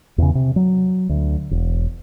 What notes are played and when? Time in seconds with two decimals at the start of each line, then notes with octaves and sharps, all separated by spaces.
0.18 E2 C#3
0.35 C3
0.56 F#3
1.09 D2
1.51 E1